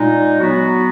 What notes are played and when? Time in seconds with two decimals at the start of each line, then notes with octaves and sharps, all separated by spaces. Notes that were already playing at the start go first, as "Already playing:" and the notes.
Already playing: A#2 G#3 D#4
0.39 F#3 B3 F#4